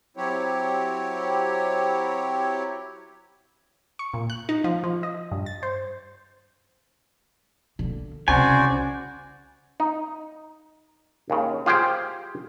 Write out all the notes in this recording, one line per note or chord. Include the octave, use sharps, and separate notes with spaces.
F#3 C4 E4 G4 C#5
C#6
A#2
F#6
D#4
F3
F3
D#5
G2
A6
C5
D3 A#3
C2 C#3 C#4 F#4 C5 D5 G#5
D#4
D#2 C#3
F4 G4 G#4 C5 G5